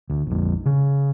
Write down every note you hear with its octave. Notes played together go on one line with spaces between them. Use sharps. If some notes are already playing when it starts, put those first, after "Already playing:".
D2
A#1 F2
C#3